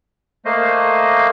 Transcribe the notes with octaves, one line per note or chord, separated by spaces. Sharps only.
A3 A#3 C5 D#5